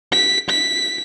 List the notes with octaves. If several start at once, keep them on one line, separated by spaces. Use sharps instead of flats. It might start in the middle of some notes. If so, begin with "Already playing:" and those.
B6
B6